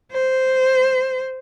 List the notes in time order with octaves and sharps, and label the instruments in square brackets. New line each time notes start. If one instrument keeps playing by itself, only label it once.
[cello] C5